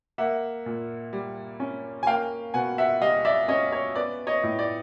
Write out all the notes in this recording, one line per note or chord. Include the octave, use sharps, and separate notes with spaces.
A#3 E5 F#5
A#2
G3
C#4
G#5
A#3 F5 G5
B2 F#5 G#5
E5 F#5
G3 D#5 F5
D5 E5
C#4 C#5 D#5
C#5
B3 D5
C#5 D#5
A2
D5